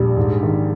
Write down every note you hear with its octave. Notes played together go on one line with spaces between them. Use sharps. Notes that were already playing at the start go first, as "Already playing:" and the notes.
Already playing: A#1 G3
G#2
D#3